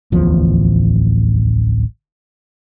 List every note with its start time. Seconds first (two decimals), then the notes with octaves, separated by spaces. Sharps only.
0.12 D1 A1 E2 F3